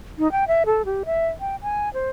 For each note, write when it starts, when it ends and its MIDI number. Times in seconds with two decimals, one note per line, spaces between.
0.18 0.30 63
0.32 0.44 79
0.48 0.63 76
0.66 0.82 69
0.85 1.03 67
1.05 1.27 76
1.40 1.56 79
1.62 1.92 80
1.94 2.10 72